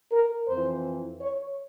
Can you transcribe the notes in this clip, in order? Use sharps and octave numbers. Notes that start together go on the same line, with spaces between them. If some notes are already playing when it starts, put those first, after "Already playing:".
A#4
F2 E3 C5
C#5